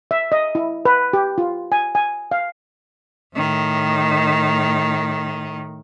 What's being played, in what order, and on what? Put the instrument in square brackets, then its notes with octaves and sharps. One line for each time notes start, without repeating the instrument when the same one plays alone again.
[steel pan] E5
D#5
E4
B4
G4
F4
G#5
G#5
F5
[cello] A2 D#3